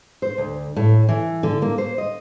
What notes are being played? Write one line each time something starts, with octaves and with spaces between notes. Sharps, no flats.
C5
D2
A2
E3
D3
A#3
C5
D#5